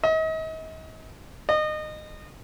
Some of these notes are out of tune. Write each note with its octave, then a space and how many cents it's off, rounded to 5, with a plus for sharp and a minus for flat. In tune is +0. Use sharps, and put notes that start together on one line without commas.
D#5 +40
D#5 -25